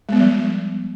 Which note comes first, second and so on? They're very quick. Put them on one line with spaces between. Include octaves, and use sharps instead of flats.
G#3 B3 G3 F3